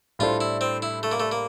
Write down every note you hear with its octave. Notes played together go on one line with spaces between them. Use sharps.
A2 G3 D4 F4 A4 C5
E4
C4
E4
A3
A#3
A3
A#3